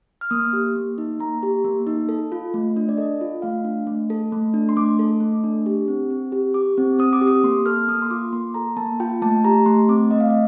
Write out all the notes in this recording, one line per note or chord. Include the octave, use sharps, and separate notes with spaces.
F6
A#3 D#6
G4
A#3
D#4
A#3 A#5
G4
A#3
D#4
A4
F4
A3
D4
D5
A4 D#5
F4
A3 F5
D4
A3
A4
A3
D4
C6
A3 D6
A4
A3
D4
G4
C4
C4
G4
G4 D6
C4
C4 D#6
D6
G4
D#6
A#3 C6
A4 F6
A#3 D#6
C6
F4 D6
A#3 C6
A4 A#5
A#3 A5
F4 G5
A3 A5
G4 A#5
A3 C6
C4 D6
A3 D#5
F5
D#5